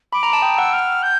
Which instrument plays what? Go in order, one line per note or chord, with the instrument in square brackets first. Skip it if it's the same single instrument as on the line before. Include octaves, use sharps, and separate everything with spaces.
[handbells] B5 [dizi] D6
[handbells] A#5
A5
[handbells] G5 [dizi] D#6
[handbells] F#5 [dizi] E6
[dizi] F6
G6